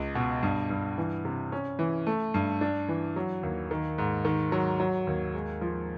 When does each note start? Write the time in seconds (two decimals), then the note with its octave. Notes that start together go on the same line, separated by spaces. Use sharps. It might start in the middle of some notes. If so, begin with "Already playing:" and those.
Already playing: C#2
0.15 B2
0.43 G2
0.70 G2
0.98 E3
1.25 C3
1.52 C#4
1.79 E3
2.06 A3
2.34 G2
2.61 D4
2.89 E3
3.16 F#3
3.43 D#2
3.71 D#3
3.98 G#2
4.25 D#3
4.52 F#3
4.80 F#3
5.07 D#2
5.34 G#3
5.61 F3